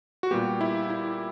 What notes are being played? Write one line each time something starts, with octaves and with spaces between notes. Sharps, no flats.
F#4
A#2 G3 B3 G4
E4
E4